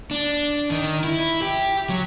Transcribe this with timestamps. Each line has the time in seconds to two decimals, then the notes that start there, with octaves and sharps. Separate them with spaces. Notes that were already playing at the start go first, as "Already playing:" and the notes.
0.11 D4
0.71 D#3
1.04 E4
1.42 G4
1.90 F#3